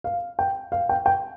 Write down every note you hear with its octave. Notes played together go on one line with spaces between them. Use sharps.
F5
G5
F5
G5
G5